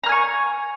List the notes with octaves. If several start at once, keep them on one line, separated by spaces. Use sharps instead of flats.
G#5 A#5 C#6 F6